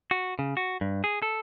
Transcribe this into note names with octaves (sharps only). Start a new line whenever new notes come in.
F#4
C#3
F#4
G2
G#4
A4